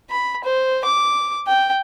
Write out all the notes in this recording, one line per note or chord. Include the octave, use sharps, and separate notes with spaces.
B5
C5
D6
G5